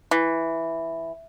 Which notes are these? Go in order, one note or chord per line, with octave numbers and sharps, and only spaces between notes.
E3